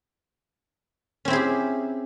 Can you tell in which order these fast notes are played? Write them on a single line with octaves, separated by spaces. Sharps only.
C#4 C4 E4 G#4 G4